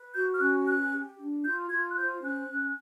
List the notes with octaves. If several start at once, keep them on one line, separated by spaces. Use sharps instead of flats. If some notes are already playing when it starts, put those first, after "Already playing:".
Already playing: B4
F#4 G6
F6
C#4 F#6
B4 F#6
G4
D4
F4 G6
F4 G#6
F#6
C5 G6
C#4 F#6
C#4